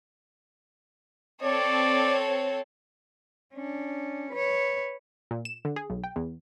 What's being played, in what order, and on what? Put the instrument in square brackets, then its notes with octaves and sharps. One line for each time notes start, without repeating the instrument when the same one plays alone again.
[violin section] C4 A4 C#5 [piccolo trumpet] D5
[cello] C#4 D4
B4 C#5
[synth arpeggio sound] A#2
E7
D3
G#4
B1
G5
E2